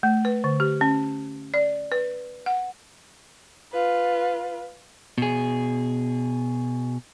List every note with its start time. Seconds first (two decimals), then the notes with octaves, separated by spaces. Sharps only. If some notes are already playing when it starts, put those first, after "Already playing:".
0.03 A3
0.25 B4
0.44 D3
0.60 G4
0.81 C#4
1.54 D5
1.92 B4
2.46 F#5
3.72 F4 B4
5.18 B2 G#4